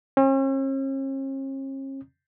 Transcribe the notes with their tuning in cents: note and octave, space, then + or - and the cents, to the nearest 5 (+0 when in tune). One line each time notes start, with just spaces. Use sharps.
C#4 -45